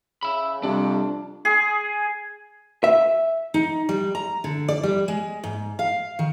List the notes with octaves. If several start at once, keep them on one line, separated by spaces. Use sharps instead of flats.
C#3 E5 B5
F2 C3 G3 D4
G#4
E5
D#4
G3
A#5
D3
D5
G3
G#3
G#2
F5
D#3